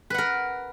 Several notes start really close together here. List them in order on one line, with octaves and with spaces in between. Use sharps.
B4 F#5 A#4